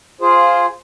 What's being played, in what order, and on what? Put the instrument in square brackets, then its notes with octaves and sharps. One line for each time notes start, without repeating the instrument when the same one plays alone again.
[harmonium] F4 G#4 C5